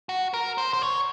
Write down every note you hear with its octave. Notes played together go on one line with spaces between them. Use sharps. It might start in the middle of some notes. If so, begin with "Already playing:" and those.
F#4
A#4
C5
C5
C#5